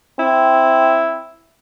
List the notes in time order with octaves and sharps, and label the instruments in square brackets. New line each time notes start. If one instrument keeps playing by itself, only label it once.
[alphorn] C4 [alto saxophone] E4